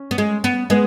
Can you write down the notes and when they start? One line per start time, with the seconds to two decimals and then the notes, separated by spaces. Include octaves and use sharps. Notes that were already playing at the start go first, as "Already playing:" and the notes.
Already playing: C#4
0.11 B3
0.18 G#3
0.44 B3
0.70 G#3 B3